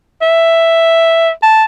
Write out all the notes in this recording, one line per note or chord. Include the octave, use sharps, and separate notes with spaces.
E5
A5